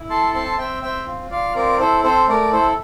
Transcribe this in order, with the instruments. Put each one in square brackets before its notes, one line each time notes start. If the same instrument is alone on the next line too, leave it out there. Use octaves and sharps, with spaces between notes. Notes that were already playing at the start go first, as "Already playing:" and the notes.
Already playing: [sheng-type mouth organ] E4
A4 A5 C6
C4 A5 C6
C4 E5 G5
C4 E5 G5
F4
F4 D5 F5
C4 A#4 D5
E4 A4 C5
C4 A4 C5
A3 A#4 D5
E4 A4 C5